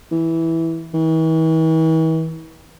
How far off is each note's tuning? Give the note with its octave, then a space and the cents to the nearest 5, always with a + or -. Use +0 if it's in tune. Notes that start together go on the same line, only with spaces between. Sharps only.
E3 -10
E3 -45